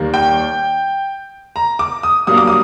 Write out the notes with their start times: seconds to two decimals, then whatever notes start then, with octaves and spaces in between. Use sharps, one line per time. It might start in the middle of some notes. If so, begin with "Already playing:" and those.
Already playing: D#2 D#3 G3 A#3
0.14 G5
1.56 A#5
1.79 D6
2.03 D#6
2.27 G2 F#3 A#3 D#6
2.37 D6
2.47 D#6